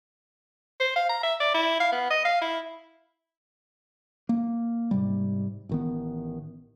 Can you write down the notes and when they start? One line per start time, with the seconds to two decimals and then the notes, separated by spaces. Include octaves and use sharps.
0.80 C5
0.96 F5
1.09 A#5
1.23 E5
1.40 D5
1.54 E4
1.80 F5
1.92 B3
2.10 D#5
2.25 F5
2.41 E4
4.29 A#3
4.91 G#2 C3 G3
5.69 A1 D#3 B3